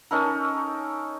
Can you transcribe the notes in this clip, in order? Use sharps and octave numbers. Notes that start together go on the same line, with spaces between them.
C#4 D#4 A4 A#4